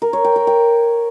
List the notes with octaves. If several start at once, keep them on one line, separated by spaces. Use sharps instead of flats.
A#4
C#5
G5
A#4
G5